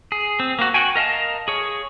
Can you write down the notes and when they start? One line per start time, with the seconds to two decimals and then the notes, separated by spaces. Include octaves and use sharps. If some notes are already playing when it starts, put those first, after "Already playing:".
0.12 G#4
0.40 C4
0.59 A#3 F#4
0.74 F#4 G5 G#5
0.96 A#4 D#5 F5 A5
1.48 G#4 C#5